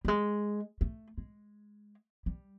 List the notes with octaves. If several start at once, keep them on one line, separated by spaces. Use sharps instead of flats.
G3
G#3
A3
G#3
G3